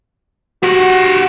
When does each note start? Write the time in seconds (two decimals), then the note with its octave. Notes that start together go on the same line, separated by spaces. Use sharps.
0.63 F#4 G4 F#5